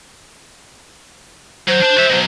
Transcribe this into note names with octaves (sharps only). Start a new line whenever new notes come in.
F#3 C5
D4 A5
F#4 E5
B2 F#3